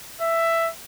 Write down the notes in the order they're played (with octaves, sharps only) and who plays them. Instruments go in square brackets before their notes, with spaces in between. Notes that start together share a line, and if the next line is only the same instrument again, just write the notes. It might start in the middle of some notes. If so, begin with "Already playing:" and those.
[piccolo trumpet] E5